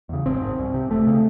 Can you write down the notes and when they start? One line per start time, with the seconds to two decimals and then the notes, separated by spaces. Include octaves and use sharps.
0.09 E2 C#3
0.26 A1 C4
0.42 G#2
0.59 C2
0.74 C3
0.90 E1 A3
1.07 C#3